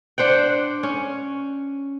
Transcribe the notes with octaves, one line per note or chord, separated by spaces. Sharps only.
D4 C5 F#5 G5
C#4